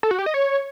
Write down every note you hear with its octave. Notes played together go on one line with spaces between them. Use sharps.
A4
F#4
G4
D#5
C#5